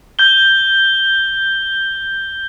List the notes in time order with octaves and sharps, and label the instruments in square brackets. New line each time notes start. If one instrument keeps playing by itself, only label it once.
[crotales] G6 G7